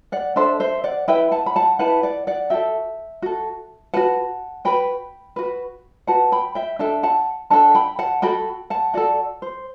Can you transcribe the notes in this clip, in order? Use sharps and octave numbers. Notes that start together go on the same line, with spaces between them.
D5 F#5
D4 A4 C5 E5
C5 E5
D5 F#5
E4 B4 E5 G5
F#5 A5
B5
F#5 A5
E4 B4 F#5 A5
D5 F#5
D5 F#5
F#4 A4 E5 G5
F#4 A4
F#4 B4 F#5 A5
F#4 B4 G5 B5
F#4 B4
F#4 B4 F#5 A5
G5 B5
E5 G5
D4 A4 E5 G5
F#5 A5
D4 A4 F#5 A5
G5 B5
F#5 A5
F#4 A4 G5 B5
F#5 A5
F#4 A4 D5 F#5
C5